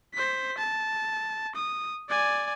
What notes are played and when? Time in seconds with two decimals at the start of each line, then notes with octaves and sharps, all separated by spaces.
0.14 C5 B6
0.58 A5
1.56 D#6
2.09 D5 G#5